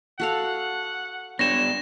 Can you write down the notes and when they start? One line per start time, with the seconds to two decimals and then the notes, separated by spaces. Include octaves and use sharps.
0.20 F#4 A4 F5 F#5
1.39 B3 D4 G4 C#5 A#6 E7